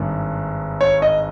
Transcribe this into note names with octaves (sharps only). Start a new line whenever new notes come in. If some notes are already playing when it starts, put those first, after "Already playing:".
Already playing: G#1 G2 D#3
C#5
D#5